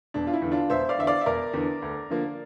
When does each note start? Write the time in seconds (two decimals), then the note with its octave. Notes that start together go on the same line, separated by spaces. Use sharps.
0.14 E1 D4
0.27 F4
0.33 E4
0.42 E2 D3
0.52 D4 F4
0.70 E1 C5 E5
0.89 D5 F5
0.99 E2 D3 E5
1.07 D5 F5
1.21 E5
1.26 E1 A#4 D5
1.54 E2 D3
1.82 D2
2.10 D3 F3 A#3